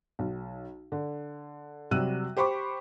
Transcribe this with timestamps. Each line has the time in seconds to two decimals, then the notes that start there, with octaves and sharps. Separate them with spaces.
0.19 B1
0.92 D3
1.91 C3 F#3 G3 E6 F#6 D#7
2.37 G4 C5 B5 C#6 D6